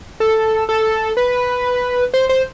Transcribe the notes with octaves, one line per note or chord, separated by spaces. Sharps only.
A4
A4
B4
C5
C5